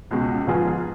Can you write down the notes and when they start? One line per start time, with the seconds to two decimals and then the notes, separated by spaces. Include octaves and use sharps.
0.11 C#2 B2 G#3
0.47 G#2 F3 B3 F4 G#4